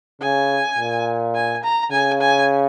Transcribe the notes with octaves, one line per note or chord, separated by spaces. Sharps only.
C#3 G#5
A#2
G#5
A#5
C#3 G#5
G#5